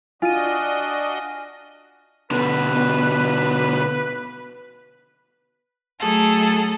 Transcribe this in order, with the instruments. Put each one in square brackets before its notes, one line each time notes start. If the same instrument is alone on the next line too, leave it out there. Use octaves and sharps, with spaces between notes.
[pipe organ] D4 F#4 D#5 [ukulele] F4 [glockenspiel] G#5 F6 D#7
[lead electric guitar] B2 D3 [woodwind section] B4
[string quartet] F#3 A3 G#4 A4 A#5